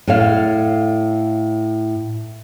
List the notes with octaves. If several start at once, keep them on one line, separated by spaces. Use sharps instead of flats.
A2 A4 C#5 F5